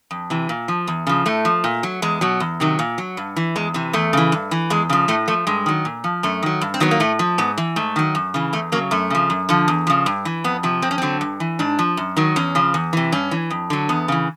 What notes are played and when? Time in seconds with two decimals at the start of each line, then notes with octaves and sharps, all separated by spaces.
0.11 F2
0.30 C3 E3
0.49 A#2
0.68 F3
0.87 E2
1.07 C#3 F3
1.26 A2 A3
1.45 F3
1.64 A#2
1.83 F#3
2.02 E2 G#3
2.21 B2 F#3
2.40 E2
2.60 C3 D#3 F#3
2.79 A#2
2.98 F#3
3.17 G2
3.36 E3
3.56 E2 G#3
3.74 C3 E3
3.93 E2 A3
4.13 C#3 E3
4.32 G2
4.51 E3
4.70 E2 G#3
4.90 C#3 F3
5.08 A2 A3
5.28 F3 A3
5.47 G2 G#3
5.66 D#3 F#3
5.85 A#2
6.04 F3
6.23 F#2 A3
6.43 D#3 F#3
6.61 G2
6.74 C4
6.80 D#3 F#3 B3
6.91 A#3
7.00 A2 A3
7.19 F3
7.38 G#2 B3
7.58 E3
7.76 G#2 A3
7.96 D#3 F#3
8.15 F#2
8.34 C#3 E3
8.53 E2 A3
8.72 C#3 F#3 A#3
8.91 F#2 A3
9.10 C#3 F3
9.30 F#2
9.49 D3 F3
9.68 E2
9.87 C#3 F3
10.06 G2
10.25 E3
10.44 F2 B3
10.63 C3 F3
10.82 F2 C4
10.91 C#4
10.98 D3 F#3 C4
11.21 G2
11.40 E3
11.59 G#2 D4
11.79 F3
11.97 F#2
12.17 D#3 F#3
12.36 E2 C#4
12.55 C#3 F3
12.74 E2
12.93 C3 E3
13.12 G2 C#4
13.31 E3
13.50 F2
13.70 D3 F#3
13.89 E2 B3
14.08 C#3 E3